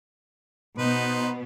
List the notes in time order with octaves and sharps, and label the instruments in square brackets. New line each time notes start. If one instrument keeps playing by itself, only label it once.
[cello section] B2 B3 [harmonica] D#4 B4 C5